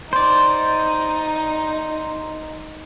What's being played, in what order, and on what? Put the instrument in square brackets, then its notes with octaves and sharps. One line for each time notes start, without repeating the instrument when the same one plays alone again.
[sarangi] D#4 [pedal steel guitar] C5 D5